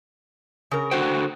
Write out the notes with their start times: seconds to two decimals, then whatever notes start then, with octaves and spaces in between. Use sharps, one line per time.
0.71 C#3 A#4
0.91 D3 F#4 C5 G5